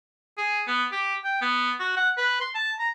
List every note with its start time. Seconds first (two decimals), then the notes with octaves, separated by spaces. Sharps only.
0.38 G#4
0.67 B3
0.92 G4
1.24 G5
1.42 B3
1.80 F#4
1.97 F#5
2.18 B4
2.41 C6
2.55 A5
2.79 A#5